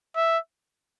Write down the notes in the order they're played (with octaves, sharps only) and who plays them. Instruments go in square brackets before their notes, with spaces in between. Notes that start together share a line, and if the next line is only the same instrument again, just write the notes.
[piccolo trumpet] E5